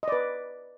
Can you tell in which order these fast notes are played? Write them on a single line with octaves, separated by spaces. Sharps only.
D#5 D5 B4